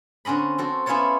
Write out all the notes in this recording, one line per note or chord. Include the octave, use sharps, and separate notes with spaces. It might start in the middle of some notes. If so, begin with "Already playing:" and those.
D3 C4 C#4 D#5 B5
C4 F#4 A4
B3 C#4 E4 F4 C#5 A5